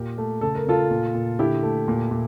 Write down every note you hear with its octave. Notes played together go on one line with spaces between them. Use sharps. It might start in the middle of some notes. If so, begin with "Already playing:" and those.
Already playing: A#2 G4 A#4
A3
C#3 A4
A#4
C#3 F4 A4
A#2
A#2
D3 E4 G4
A3
A#2
A#2